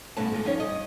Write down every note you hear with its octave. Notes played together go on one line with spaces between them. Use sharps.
G2 B2 A3 C#4 A5
D3 G#3 F4 A4
D#3 F3 C#4 C#5
G2 D#5